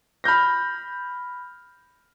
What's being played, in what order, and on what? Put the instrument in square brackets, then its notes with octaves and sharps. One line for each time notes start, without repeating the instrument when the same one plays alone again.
[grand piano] B5 F6 G6 A#6